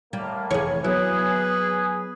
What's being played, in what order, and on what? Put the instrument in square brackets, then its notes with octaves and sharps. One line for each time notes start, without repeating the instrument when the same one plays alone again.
[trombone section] A2 A#3 [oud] G3
[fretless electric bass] F1 E3 [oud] G#4 C#5
[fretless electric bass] F#3 B3 [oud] E4 [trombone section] G#4 [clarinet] B4